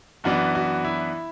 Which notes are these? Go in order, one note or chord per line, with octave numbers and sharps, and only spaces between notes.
F#2 E3 B3 D4 F#4
F#4
E4